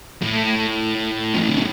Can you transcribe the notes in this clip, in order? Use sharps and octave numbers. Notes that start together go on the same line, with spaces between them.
A2
F3
E3
D3
C#3